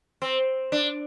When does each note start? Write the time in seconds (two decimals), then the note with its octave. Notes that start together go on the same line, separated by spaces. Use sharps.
0.22 C4
0.72 D4